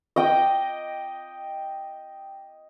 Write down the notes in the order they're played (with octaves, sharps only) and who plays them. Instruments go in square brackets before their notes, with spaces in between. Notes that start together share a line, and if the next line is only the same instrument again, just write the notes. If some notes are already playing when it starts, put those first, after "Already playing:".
[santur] D#5 G5